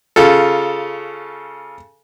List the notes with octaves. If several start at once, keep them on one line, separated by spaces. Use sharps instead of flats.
C#3 F4 A4